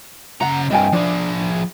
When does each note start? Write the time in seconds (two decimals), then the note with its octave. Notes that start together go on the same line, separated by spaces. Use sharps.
0.41 C#3 F#5 A#5
0.70 C2 G2 D#5 G5 G#5
0.93 F3 D4 G#4